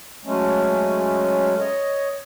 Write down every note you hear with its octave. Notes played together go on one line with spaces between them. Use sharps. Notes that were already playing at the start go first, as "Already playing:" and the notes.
F#3 G#3 A3 C#4
C#5 D#5